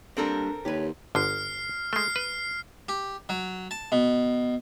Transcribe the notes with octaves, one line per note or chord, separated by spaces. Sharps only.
G3 A#3 C4 D4 A4 A#4
D#2 G4 B4 C#5
G1 D3 F6 C7
G#3 A3 F6 C7
B4
G4
F#3
A5
B2